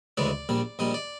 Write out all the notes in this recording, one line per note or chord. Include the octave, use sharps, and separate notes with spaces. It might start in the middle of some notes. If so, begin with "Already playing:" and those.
D2 C#3 E3 G#3 D5
A#1 A#2 G3
A#1 A#2 G3 D#5
D5